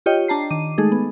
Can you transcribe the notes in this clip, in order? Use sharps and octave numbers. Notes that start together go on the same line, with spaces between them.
F4 G4 C#5 D#5 G5
D4 A5 A#5 C7
D#3 D6 D#7
G#3 A3 D#4 G#4 A4
B3